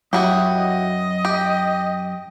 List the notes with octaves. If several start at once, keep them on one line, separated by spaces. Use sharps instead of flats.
F#2 E4 F#4 G4 D#6
D#5
G4